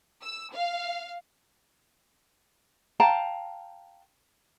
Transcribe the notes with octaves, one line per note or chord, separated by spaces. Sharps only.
E6
F5
F5 G5 A5 A#5